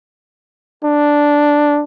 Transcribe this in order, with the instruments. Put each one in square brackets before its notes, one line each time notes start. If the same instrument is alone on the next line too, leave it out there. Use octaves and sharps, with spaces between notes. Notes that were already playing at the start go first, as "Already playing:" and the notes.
[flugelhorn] D4